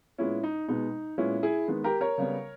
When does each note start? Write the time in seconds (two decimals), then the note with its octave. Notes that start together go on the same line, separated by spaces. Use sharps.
0.18 A#2 G#3 B3 C#4 E4
0.44 D#4
0.68 B2 G#3 B3 D#4
1.18 A#2 G#3 B3 C#4 E4
1.43 E4 G#4
1.68 D#3 G#3 B3
1.84 G4 A#4
2.01 A#4 C#5
2.18 C#3 G3 B3